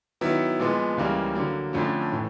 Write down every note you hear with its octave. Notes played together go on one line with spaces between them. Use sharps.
D#3 F#3 B3 E4
A#2 F3 G#3 B3
C#2 C#3 E3 G3 A#3
D3 F#3 A#3
F2 D3 F3 A3 C#4
A2 E3